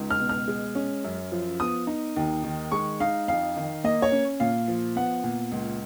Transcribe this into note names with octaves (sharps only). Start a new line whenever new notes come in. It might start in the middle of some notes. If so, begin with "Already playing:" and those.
Already playing: C#2 D#4
F6
B2
F6
G#3
C#4
F#2
F3
B3 D#6
D#4
D#2
D#3
G#3 C#6
D#4 F5
F2 F5
D#3
A#3 D#5
C#5
C#4
A#2 F5
F3
B3 F#5
A#2
C#2